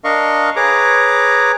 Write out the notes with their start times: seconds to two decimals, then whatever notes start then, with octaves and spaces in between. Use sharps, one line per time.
0.04 D4 A#4 D#5 F5 C#6
0.56 G#4 B4 C#5 A#5 D6